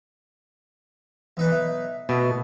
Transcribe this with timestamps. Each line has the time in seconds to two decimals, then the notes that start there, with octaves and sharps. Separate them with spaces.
1.37 B1 E3 D#4 B4
1.52 E5
2.09 B2 A3 E5